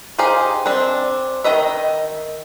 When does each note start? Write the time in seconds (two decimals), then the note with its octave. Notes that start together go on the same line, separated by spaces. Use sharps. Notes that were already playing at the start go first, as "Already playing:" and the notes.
0.19 D#4 G4 G#4 C5 F5
0.66 C4 D4
1.44 D#3 D#4 D#5 E5